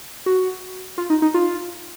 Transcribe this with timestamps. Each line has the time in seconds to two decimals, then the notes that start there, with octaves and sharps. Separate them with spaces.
0.26 F#4
0.98 F4
1.10 D#4
1.22 D#4
1.34 F4